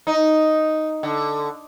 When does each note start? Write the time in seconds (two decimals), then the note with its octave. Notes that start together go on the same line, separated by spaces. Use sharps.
0.07 D#4
1.03 D3